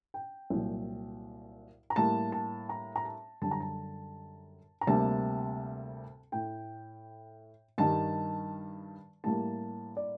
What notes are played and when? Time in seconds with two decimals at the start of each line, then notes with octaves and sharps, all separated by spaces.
0.14 G5
0.50 C2 A#2 F#3
1.90 A#5
1.96 A2 G3 A#3 A5
2.32 A5
2.69 A#5
2.96 A#5
3.05 A5
3.41 F#2 D3 G3 A5
3.51 A#5
3.60 A5
4.81 A#5
4.87 D2 C3 G3 A#3 A5
6.32 A2 A3 G5
7.78 G2 D#3 G3 A5
9.24 A2 G3 A#3 A5
9.97 D5